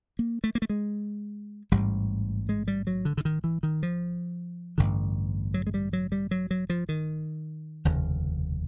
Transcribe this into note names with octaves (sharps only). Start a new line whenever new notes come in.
A#3
A3
A#3
A3
G#3
A1 G#2 G3
G#3
G3
F#3
D3
D3
D#3
E3
D#3
F3
A1 G2 D3
F#3
G#3
G3
F#3
G3
F#3
F#3
F3
D#3
F1 D#2 C#3